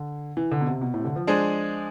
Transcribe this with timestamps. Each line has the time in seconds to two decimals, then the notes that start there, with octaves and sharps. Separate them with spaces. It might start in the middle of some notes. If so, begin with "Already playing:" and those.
Already playing: D3
0.37 E3
0.51 D3
0.61 B2
0.67 C3
0.82 B2
0.94 A2
1.00 C3
1.05 D3
1.16 F3
1.27 G#3 D4 G#4 C5